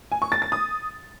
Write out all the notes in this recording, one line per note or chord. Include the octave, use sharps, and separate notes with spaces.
G#5
C#6
A6
A6
D#6